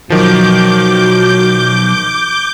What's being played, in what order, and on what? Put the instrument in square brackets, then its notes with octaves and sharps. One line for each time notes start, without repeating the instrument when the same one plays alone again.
[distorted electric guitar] B1 E2 [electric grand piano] D#3 F3 [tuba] F#3 [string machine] D6 G6